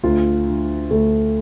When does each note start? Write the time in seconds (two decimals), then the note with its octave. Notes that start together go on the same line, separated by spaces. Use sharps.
0.03 D2 F4
0.47 D3
0.91 D2 A3